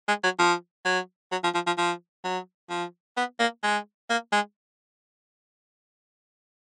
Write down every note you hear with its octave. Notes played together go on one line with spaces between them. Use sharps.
G#3
F#3
F3
F#3
F#3
F3
F3
F3
F3
F#3
F3
B3
A#3
G#3
A#3
G#3